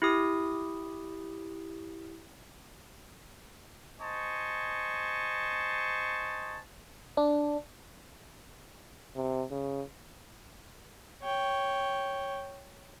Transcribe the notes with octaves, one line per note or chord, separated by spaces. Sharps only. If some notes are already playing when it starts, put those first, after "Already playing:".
E4 G4 D#6
C5 D#5 G#5 A5 C#6
D4
C3
C#3
C#5 G5